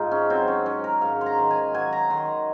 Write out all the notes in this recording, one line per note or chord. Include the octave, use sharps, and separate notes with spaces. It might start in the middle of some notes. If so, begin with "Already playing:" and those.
Already playing: G#2 D#4 F4 G#4
C#4
F#3 C4
C#4
F#3 C#4
A#4
G#2 F5
C6
A#5
D#3
G#5
F#3 G#5
A#5
D#3 C6